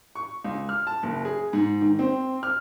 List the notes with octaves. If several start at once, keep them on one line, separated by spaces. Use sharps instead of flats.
C#6
C#2
F6
A5
F#1
G#4
G#2
D#3
C4
F6